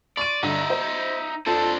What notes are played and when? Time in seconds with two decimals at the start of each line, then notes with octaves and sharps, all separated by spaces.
0.17 D5 C6 C#6 D#7
0.43 G2 D3 D#4 E5
0.70 C5
1.46 F2 D4 A4 C5